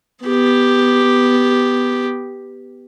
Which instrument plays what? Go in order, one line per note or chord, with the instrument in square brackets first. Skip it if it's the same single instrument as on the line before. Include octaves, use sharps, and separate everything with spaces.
[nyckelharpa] B3 G4